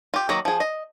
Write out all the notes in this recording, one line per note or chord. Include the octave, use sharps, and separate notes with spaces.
F4 G4
D#3 F#3 A#3 A#5
F3 G#4
D#5